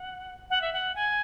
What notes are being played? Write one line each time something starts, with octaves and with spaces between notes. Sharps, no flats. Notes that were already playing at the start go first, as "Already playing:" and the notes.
Already playing: F#5
F#5
E5
F#5
G#5